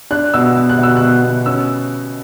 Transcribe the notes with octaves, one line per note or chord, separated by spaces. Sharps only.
D4 F#6
B2 E6
B2
F#6
B2 E6
B2 F#6
B2
C#4 E6